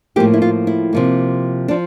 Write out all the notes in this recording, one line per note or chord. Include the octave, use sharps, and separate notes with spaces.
A2 F3 A#3 G4
E4
F4
E4
C3 F3 A#3
F3 D4